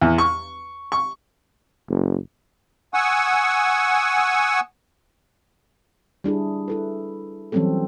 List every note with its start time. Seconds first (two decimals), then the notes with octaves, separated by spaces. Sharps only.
0.02 E2
0.18 C#6
0.92 C#6
1.89 F#1
2.94 F#5 G#5 C#6 D#6 E6
6.24 G3 D4 E4 G#4
6.68 E4 A4 B4
7.52 E3 F#3 G3 C4 C#4 A4